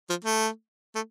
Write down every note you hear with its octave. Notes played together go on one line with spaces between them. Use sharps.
F3
A3
A3